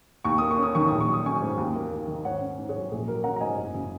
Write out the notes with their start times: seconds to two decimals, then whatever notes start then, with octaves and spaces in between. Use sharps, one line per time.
0.25 D#2 C#6
0.38 A#3 D#6
0.51 C#6
0.58 C#4
0.63 D#6
0.75 D#3 C#6
0.88 A#1 D#6
1.01 C#6
1.08 F#3
1.13 D#6
1.25 C#4 G#5 C#6
1.42 G#2
1.57 D#2
1.75 A#3
1.91 D#2
2.07 D#3
2.25 G#2 C#5 F#5
2.41 C#4
2.58 G#2
2.69 G#4 C#5
2.75 F#3
2.92 A#1 G#4
3.08 F#3 A#4
3.24 C#4 F#5 A#5
3.36 A#5
3.41 G#2 D#5 G#5
3.58 F#1
3.74 C#3